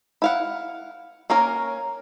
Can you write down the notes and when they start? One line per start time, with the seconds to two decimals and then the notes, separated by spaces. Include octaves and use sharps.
0.22 E4 F5 F#5
1.30 A#3 C#4 A#4